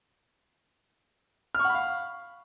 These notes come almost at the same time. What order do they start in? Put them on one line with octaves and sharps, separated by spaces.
F6 C#6 F#5 B5 F5